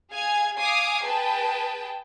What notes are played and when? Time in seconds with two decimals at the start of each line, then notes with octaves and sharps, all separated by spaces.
0.11 G#4 F5 G#5 G#6
0.58 F5 G#5 D6 D#6 G#6 C7
1.04 G#4 B4 G5 A5